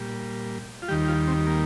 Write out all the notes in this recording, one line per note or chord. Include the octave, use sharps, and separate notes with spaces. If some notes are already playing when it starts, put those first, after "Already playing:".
Already playing: A#2 G3
F4
D#2 D#3 G3 G4
F4
C4
A#3